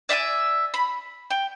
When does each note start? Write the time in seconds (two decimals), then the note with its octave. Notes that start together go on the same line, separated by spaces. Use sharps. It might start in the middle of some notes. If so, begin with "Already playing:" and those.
0.09 D5 E5 F5 G#5
0.74 B5
1.30 G5